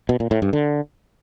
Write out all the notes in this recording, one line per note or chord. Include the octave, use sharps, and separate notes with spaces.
B2
A#2
A2
G2
D3